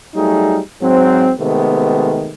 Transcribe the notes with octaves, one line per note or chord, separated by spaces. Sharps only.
F#3 G3 A3 D#4 G#4
G#2 F#3 C4
C3 D#3 G#3 A3 B3